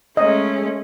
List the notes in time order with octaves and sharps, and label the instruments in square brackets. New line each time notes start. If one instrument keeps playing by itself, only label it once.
[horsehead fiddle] G#3 A3 [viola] C#4 [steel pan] D#5